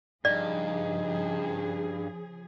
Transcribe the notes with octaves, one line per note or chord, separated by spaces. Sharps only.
G2 C#3 F3 D#4 G#4 D5